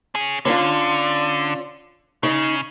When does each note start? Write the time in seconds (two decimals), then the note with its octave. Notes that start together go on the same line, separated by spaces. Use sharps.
0.15 C#4 G#4
0.45 D3 C#4 D4 F4
2.23 C#3 D#4